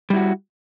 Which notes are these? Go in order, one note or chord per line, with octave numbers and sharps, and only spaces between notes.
G3 E4 F#4